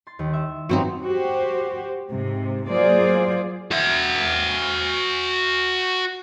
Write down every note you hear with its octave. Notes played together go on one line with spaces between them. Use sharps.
C6 A6
D#2
E5
G2 F#3 C4 D#4
F#4 G4 C5
G#2 C3
F#3 A#3 F4 G#4 C5 D5
F#4 E5